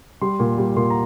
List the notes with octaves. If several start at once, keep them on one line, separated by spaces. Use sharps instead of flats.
G3 C6
A#2
G3
A#2 C6
A#5